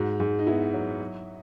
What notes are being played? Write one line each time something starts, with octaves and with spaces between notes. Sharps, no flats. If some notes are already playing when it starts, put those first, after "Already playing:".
Already playing: G#2 F#4
G#2
D#4
B3 E4
F#3
F#3